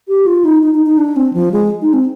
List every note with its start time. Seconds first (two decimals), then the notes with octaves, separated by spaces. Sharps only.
0.09 G4
0.26 F4
0.44 D#4
0.63 D#4
0.74 D#4
0.86 D#4
0.98 D4
1.16 C4
1.34 F3
1.52 G#3
1.82 D#4
1.93 C4